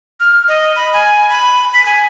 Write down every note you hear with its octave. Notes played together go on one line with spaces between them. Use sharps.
F6
D#5
B5
G#5
B5
B6
G#5